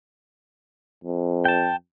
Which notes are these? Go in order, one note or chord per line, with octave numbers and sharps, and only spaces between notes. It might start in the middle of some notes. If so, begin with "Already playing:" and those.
F2
G5 A5